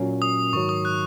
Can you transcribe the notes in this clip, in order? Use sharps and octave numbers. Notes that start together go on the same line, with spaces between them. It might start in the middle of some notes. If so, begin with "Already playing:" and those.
Already playing: A#2 F#3 A#3 C#4
D#6
G#2 D#3 F#3 C#6
D#6
F#6